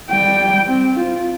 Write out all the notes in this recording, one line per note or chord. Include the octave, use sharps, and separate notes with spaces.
G3 G5
C4
F4